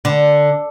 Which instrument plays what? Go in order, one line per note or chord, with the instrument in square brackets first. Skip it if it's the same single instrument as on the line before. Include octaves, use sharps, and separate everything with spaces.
[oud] D3